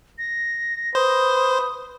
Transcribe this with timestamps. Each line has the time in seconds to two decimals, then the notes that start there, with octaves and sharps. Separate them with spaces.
0.18 A#6
0.95 B4 C5 D#6